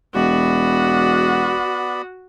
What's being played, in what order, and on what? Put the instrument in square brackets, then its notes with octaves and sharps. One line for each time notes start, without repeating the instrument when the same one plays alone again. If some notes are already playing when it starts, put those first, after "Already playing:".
[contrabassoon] E1 [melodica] B3 D5 B5 [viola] F#4